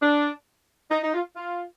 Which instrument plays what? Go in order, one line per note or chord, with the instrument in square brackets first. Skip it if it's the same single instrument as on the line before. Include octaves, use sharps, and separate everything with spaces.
[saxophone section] D4
D#4
D#4
F4
F4